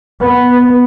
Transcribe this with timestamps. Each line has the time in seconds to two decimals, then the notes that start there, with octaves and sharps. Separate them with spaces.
0.22 B3